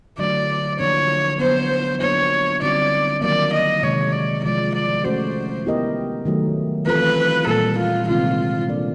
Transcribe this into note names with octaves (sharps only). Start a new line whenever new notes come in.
D3 F#3 A3 D5
D3 F3 A#3 D4 C#5
D3 F#3 B3 C5
F#3 A#3 D4 F4 C#5
D3 G3 C4 D#4 F#4 D5
D#3 F#3 A#3 D5
D#5
C3 D#3 G#3 C#5
D5
C3 F3 G#3 D5
D5
A3 C#4 F#4 C5
B3 E4 G4 A#4 D#5
D#3 F#3 A3
E3 A3 C4 F4 A4 B4
A#2 G3 A#3 A4
F4
C3 D#3 G#3 C4 F4
A#3 D4 F4 A4 D5